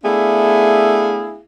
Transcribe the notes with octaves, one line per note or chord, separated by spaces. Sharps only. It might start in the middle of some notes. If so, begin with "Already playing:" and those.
A3 B3 D4 E4 G#4 F5